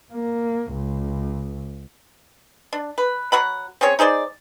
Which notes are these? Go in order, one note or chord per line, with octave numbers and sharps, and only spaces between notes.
A#3
C#2
D4
B4
F#3 F#5 B5
C4 C#4 G#4 C#5
D#4 G#4 C5 D5